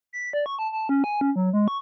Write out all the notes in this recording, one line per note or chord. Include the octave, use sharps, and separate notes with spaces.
B6
D5
C#6
A5
A5
C#4
G#5
C#4
F#3
G#3
C#6